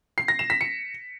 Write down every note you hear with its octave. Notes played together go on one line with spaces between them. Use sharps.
C7
A#6
E7
B6
C#7